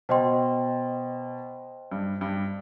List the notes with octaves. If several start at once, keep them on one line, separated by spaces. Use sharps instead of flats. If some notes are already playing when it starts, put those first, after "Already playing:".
B2 C5 D#5 G5 C6
G2
G2